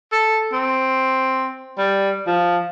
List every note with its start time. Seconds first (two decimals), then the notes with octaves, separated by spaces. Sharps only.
0.12 A4
0.53 C4
1.78 G3
2.27 F3